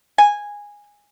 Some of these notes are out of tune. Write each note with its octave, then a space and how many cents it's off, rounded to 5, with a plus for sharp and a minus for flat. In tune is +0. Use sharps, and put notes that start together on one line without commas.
G#5 -10